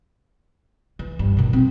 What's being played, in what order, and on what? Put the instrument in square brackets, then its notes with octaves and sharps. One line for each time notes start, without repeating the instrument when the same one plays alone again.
[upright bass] E3
G2
B2 D#3
C4